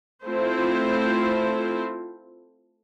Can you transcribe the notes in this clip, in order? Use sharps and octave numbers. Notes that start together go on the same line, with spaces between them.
A3 C4 E4 F4 A4 C5